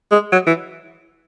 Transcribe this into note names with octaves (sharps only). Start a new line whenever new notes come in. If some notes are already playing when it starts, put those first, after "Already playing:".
G#3
F#3
E3